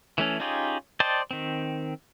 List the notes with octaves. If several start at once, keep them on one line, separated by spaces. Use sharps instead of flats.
E3 A3 C#4
C#4 D#4 F4 G4 G#4
C5 D5 D#5 G5 A5
D#3 C4